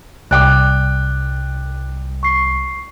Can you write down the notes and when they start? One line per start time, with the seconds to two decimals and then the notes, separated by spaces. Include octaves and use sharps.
0.31 C2 D5 G5 D6 F#6
2.23 C#6 C7